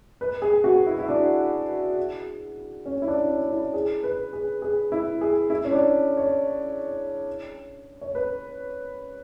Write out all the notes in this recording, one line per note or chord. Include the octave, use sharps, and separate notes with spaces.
B4
G#4
F#4
E4
E4
D4
C#4
E4
D4
C#4
E4
G#4
B4
G#4
G#4
E4
G#4
E4
C#4
D4
C#5
C#5
B4